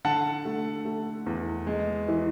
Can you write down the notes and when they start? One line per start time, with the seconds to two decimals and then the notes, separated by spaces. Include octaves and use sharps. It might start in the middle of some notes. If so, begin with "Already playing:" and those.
0.05 D3 F#5 A5
0.45 A3
0.85 A3
1.26 E2
1.67 G#3
2.08 E3